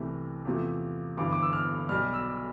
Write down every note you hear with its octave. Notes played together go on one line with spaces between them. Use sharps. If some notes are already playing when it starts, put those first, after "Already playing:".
Already playing: C2 C3 E3 A3
E2 C3 F3 A3
G1 G2 E3 D6
D6
E6
F6
B1 B2 G3 F6
E6